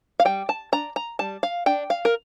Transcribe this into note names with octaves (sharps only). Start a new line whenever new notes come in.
F5
G3 G5
A5
D4 A#5
A#5
G3 A5
F5
D4 G5
F5
A#4